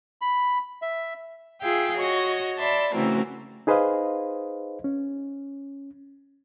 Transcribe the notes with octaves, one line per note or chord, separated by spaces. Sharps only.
B5
E5
F4 G#4 E5 F5 G5
F#4 C#5 D#5 C#6
D5 E5 A5 B5 C6
C#3 E3 A3 C4 F#4 A#4
D#4 G#4 B4 C5 D#5 F5
C#4